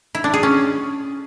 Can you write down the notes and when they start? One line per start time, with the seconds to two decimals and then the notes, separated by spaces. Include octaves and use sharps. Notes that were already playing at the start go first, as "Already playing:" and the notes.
0.15 E4
0.24 D4
0.34 G#4
0.43 C#4